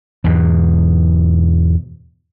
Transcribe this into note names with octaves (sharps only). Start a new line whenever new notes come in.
E2 G#2 B2